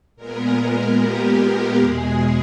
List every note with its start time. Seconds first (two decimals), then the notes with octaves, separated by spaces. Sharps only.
0.16 A#2 G#3 B3 A#4
0.96 G4
1.77 E2 B2 G#3 G#4